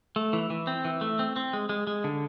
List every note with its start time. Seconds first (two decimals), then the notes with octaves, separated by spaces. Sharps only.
0.16 A3
0.33 E3
0.50 E3
0.67 C4
0.85 E3
1.01 A3
1.19 C4
1.36 C4
1.53 G#3
1.69 G#3
1.87 G#3
2.04 D3